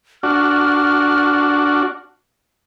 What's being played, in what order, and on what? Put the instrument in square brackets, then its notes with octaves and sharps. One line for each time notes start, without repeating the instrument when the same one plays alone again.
[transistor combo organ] D4 F#4 [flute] F6